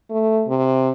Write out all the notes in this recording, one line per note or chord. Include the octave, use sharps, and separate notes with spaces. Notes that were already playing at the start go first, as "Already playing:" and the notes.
A3
C3